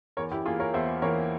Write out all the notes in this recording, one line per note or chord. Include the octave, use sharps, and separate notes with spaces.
E2 A#4 C#5
E4 G4
E3 A#3 F4 G#4
A#4 C#5
E2 C5 E5
E3 A#3 A#4 C#5